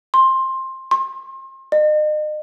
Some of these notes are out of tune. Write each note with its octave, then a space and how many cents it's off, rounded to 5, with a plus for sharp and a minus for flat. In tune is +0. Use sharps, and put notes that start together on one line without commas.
C6 +15
C6 +35
D#5 -40